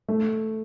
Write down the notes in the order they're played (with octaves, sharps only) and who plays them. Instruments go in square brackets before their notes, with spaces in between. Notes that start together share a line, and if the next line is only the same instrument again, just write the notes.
[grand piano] A3